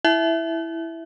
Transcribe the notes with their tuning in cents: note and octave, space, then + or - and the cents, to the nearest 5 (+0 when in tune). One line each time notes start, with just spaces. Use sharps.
E4 +0 E5 +0